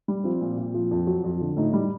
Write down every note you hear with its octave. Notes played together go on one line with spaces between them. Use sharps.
G3
F3 C4
A#2
A#2
F3
F2
F#3
F2
D3
A2 D#4
G3